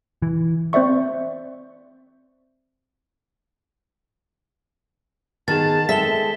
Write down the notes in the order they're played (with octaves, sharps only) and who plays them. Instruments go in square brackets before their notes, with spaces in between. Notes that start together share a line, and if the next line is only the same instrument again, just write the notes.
[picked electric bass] E3
[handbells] C4 C5 D5 E5 C#6
[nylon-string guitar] D#3 [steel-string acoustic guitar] B3 G#4 [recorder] A5 [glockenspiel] A6
[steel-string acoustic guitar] G#3 C4 A4 [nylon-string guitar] E5 [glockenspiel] B6 G7